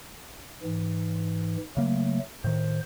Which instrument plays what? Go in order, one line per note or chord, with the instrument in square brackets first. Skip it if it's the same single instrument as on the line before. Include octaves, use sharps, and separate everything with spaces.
[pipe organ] G#2 E3
[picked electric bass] C#3 A#3 [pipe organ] F#3 A3
[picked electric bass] A2 D#3 [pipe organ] C5